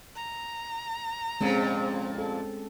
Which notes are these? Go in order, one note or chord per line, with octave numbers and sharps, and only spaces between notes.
A#5
F2 A#2 G#3 C4 C#4
A4